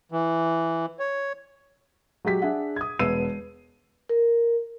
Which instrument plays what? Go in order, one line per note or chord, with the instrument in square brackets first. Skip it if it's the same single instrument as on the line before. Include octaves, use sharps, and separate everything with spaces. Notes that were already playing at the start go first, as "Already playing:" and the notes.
[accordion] E3
C#5
[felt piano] F#3 G#3 G4 B6
D4 G#4 E5 F#5
D#6 G#6
E1 B3 B4 E6 C7 D#7
[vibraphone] A#4